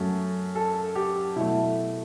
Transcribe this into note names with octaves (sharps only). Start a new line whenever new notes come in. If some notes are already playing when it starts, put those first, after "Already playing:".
Already playing: F#2 F#3 A3
A4
G4
B2 F#3 A3 E4